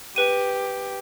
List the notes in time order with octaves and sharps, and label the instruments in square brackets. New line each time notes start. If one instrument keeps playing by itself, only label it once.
[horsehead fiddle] G4 [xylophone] B4 D#7